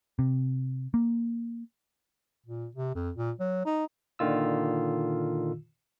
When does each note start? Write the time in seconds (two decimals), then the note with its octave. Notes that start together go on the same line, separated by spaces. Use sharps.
0.19 C3
0.94 A#3
2.46 A#2
2.75 C3
2.95 F2
3.16 A#2
3.40 F#3
3.66 D#4
4.19 A#2 D3 D#3 F4 E6